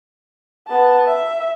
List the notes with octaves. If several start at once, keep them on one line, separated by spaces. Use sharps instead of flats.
B3 A5
E5